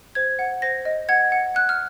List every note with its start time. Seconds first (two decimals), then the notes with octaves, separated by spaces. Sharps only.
0.15 C5 G#6
0.39 F#5
0.62 C5 A#6
0.85 D#5
1.09 F#5 G#6
1.32 F#5
1.55 F#5 F#6
1.69 F6